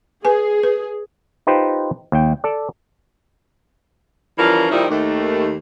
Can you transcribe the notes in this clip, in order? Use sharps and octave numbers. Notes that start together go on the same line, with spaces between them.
G#4 B4 G#5
B4
D#4 F4 G4 B4 C5
D#2 G5
A4 D5
E3 F3 G3 C#4 F4 A#4
A#2 D#3 F3 G3 D#4 E4
D#2 D#3 A3